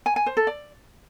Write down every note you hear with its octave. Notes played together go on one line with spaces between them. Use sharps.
G#5
G#5
C5
A4
D5